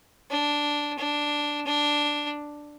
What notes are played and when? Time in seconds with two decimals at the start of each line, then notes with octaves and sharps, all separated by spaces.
0.31 D4
0.99 D4
1.67 D4